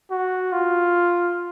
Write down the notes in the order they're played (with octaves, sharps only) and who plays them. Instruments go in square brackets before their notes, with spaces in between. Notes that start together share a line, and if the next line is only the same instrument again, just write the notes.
[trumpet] F#4
F4